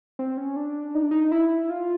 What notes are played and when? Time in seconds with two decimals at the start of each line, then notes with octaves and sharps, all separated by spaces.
0.19 C4
0.37 C#4
0.56 D4
0.95 D#4
1.02 D4
1.11 D#4
1.32 E4
1.70 F4